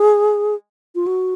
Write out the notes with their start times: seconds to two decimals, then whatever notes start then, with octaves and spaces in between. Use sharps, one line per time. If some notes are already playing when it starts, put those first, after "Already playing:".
Already playing: G#4
0.95 F4
1.07 F#4